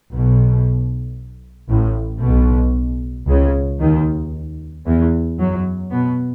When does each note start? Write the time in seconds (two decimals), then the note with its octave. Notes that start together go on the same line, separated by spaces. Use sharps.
0.13 B1 B2
1.70 A1 A2
2.23 B1 B2
3.28 C#2 C#3
3.81 D#2 D#3
4.86 E2 E3
5.39 F#2 F#3
5.91 B2 B3